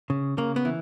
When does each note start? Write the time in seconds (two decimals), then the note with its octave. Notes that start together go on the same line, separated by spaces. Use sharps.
0.10 C#3
0.38 C#3 A#3
0.56 B3
0.65 E3